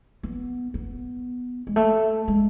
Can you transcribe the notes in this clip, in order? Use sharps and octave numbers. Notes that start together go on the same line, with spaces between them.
B3
B3
G#3
A3
G#3